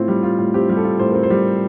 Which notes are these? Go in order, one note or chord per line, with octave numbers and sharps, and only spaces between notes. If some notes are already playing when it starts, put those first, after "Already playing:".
Already playing: A2 C4 F4
G3
F4
A2
C4 G4
G3
A4
F4
A2 C5
C4 A#4
C5
G3